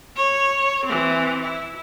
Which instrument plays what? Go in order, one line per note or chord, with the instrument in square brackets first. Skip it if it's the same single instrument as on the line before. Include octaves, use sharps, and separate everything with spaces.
[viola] C#5
E3 C4
E4